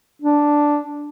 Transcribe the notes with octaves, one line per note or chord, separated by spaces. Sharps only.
D4